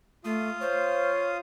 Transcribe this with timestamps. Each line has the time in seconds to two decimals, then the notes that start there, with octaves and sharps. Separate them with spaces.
0.25 A3 F4 F5 D#6
0.61 C5 C#5